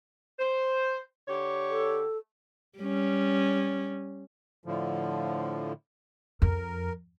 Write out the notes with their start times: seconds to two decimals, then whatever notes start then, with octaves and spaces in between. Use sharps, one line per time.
0.39 C5
1.28 D3 G4 C#5
1.69 A4
2.79 G3 C#4
4.65 A2 D3 F3
6.42 F2 A#4